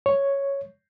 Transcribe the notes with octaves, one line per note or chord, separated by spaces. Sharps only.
C#5